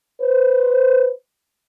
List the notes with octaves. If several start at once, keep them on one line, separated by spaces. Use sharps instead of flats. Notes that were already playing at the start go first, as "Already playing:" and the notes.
B4 C5